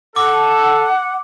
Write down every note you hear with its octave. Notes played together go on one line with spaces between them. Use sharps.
A4 F#5 D6